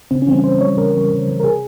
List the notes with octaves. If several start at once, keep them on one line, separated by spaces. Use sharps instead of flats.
C#3 C4
C#4
E3 C4
G3 C#4
C#3 C5
E3 G3 C#5
C#3 A#4
E3 G3
C#3
E3 G3
A#4
C3 G#4